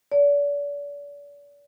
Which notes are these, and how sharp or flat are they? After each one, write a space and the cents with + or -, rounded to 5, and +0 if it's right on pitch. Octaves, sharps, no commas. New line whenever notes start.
D5 -40